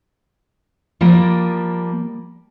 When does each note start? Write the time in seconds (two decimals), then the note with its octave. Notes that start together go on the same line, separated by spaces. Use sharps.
1.01 F3 G3 A#3